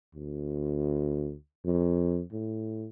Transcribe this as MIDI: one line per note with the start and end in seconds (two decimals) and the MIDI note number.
0.15 1.35 38
1.65 2.22 41
2.33 2.88 45